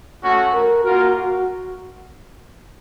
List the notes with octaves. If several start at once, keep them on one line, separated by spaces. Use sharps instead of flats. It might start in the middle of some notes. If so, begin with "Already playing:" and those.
A3 C#4 F#4
A#4
A#3 F4 F#4 A#4
F#4